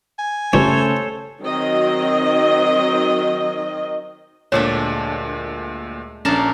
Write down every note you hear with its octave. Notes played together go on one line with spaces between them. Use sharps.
G#5
G2 C#3 F3 A3 C#4 A4 C5 C#5
D#3 F#3 C4 D#5
D2 A#2 G#3 A3 D4 C#5
A#1 C#4 D4 A#4 A5